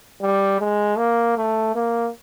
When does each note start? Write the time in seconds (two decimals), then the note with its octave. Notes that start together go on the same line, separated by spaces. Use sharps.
0.21 G3
0.60 G#3
0.98 A#3
1.37 A3
1.75 A#3